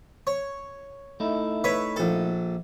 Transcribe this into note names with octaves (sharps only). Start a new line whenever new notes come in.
C#5
A3 D#4 E4
B4 C#5 E5
A#1 A4